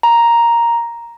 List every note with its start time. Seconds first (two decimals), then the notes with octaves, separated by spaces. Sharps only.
0.03 A#5